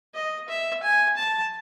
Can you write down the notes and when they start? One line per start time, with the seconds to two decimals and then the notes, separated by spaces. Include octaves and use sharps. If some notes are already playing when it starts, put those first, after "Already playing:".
0.14 D#5
0.48 E5
0.83 G#5
1.17 A5